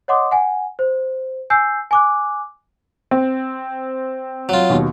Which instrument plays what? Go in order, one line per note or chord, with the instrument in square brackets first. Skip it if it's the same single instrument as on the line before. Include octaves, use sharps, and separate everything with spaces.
[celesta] C#5 D#5 F#5 C6 D6 D#6
F#5 G#5
C5
G#5 E6 G6 C7
G#5 D6 F#6
[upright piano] C4
[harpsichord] F#3 F4
[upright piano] D#2 B2